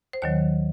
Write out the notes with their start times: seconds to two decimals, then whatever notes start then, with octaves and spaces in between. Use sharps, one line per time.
0.13 C5
0.22 D#2 D#3 F#3 C#5